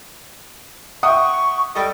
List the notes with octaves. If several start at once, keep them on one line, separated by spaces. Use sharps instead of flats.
E5 F#5 G5 C#6 D#6
G3 A4 D#5 G5